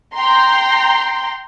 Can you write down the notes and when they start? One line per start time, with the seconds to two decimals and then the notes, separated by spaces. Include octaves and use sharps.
0.15 G5 A#5 C6